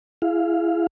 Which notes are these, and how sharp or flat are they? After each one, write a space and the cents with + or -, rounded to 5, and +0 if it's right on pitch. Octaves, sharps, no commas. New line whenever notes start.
E4 +25 G#4 +0 F5 +0